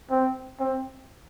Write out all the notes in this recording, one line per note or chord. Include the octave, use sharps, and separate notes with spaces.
C4
C4